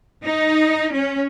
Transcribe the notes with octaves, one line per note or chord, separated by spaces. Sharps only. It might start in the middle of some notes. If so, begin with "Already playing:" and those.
D#4
C#4